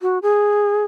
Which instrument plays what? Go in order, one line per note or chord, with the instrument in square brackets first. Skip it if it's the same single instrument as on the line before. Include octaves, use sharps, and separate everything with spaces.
[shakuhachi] F#4
G#4